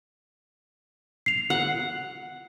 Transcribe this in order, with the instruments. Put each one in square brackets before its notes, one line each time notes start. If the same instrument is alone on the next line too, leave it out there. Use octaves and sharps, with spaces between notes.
[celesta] C7 F7
[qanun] F#5